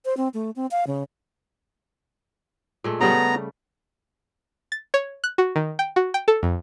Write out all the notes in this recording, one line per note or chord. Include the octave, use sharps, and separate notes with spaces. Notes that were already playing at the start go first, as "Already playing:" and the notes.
C5
C4
A3
C4
F5
C#3
A#2 G#3 A3
C#3 G3 A3 B3 A#5
A6
C#5
F#6
F#4
D#3
G5
F#4
G5
A4
F2